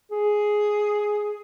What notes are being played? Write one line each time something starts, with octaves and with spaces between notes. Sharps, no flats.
G#4